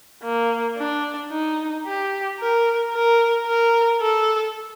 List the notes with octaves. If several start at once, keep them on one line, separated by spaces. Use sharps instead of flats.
A#3
D4
D#4
G4
A#4
A#4
A#4
A4